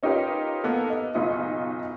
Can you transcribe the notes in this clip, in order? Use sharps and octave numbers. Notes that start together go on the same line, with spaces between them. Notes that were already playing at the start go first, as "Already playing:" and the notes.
C#4 D#4 F4 G4 A#4 B4
A#3 B3 A4
D#5
F#1 B1 D#4 F4 D#5